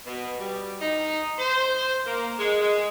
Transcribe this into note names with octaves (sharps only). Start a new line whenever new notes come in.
B2
G3
D#4
C5
A#3
G#3
G#3